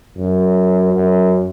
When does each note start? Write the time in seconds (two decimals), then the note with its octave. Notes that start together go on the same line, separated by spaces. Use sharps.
0.17 F#2
0.93 F#2